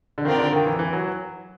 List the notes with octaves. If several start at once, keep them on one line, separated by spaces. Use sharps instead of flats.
D3
D#3 C4 F4 A#4 D5 G5
D3
D#3
E3
E3
F#3